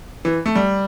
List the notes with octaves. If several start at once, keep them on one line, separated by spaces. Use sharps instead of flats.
E3
A3
G3